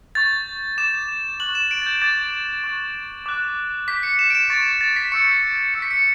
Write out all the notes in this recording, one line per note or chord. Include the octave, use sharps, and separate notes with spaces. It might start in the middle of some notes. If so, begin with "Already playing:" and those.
C#6 G6 A6
D6 G6 E7
C#6 F#6 F#7
E7
D7
A6
G6
D6 G6 A6
C#6 F#6
D6 F#6
D6 G6 B6
C#7
E7
D7
E7
C#6 G6 A6
A6
B6
C#6 E6 G6 C#7
C#6 E6 G6 C#7
B6
C#7